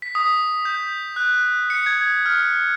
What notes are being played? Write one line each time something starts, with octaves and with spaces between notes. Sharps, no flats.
B6
D#6
G6
F#6
C#7
G#6
F6